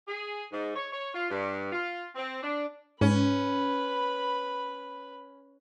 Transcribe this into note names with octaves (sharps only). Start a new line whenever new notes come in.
G#4
G#2
C#5
C#5
F4
G2
F4
C4
D4
G#2 C#4 B4 B5